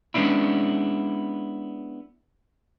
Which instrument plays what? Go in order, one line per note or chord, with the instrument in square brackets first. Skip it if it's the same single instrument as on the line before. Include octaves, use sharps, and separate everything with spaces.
[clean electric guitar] G#3 B3 C#4 D4 E4